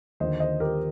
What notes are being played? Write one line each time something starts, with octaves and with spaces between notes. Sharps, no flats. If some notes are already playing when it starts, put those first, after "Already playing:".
D#2 D3 F3 C5 D#5
C5 D#5
G4 A#4